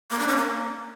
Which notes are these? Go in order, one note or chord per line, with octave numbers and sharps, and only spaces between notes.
A#3
D4
C#4
A#3